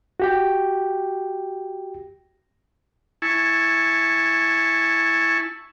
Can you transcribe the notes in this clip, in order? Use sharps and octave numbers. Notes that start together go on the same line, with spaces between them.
F#4 G4 G5
E4 G#5 A5 C#6